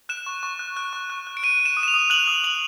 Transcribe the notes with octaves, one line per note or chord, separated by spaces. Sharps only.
F#6 E7
C#6
C#6
F#6
F#6
C#6
F#6
F#6
D7
F#6 D#7
F#6
E7
D#6
E7
F7
D#6
F#6 F#7
D#6
D#6 F#7